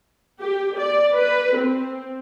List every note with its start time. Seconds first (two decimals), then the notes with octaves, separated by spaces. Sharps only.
0.42 G4
0.79 D5
1.15 B4
1.57 C4